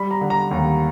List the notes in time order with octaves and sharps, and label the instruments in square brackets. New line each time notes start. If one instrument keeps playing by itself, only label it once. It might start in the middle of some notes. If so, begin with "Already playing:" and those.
Already playing: [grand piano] G3 B5
A#5
D3
A#5
D#2